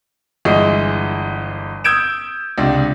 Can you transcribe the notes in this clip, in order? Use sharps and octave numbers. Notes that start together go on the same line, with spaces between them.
G1 E3 G#3 D#5
D#6 E6 G6 G#6 D7 E7
C#2 C3 D4